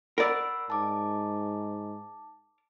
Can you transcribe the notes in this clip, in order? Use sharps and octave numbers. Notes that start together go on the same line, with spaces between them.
A#4 D5 F#5 B5 E6
G#2 A5 D6